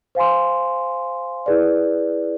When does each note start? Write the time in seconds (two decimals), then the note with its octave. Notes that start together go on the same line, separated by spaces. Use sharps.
0.15 C5 F5 G#5 C6
1.46 E4 G#4 B4 D5